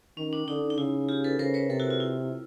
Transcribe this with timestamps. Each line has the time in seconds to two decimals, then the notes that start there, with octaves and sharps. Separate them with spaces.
0.17 D#3 C#4
0.33 D4
0.47 D3 D#4
0.70 D#4
0.78 C#3 E4
1.09 F4 G4
1.24 A4 B4
1.39 C#3 A#4 C5
1.54 B4 C#5
1.70 C3 A4 B4
1.79 E4 F#4
1.90 F4
2.00 E4